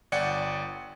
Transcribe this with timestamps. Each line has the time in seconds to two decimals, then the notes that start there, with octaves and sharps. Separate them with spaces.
0.12 G1 D5 F#5 G5 C#7